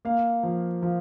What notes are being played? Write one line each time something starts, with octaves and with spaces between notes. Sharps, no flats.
A#3 F5
F3
F3